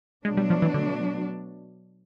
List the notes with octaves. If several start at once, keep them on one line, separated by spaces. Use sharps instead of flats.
B2 F#3 G#3 A3 D4
G3
F3
E3
D3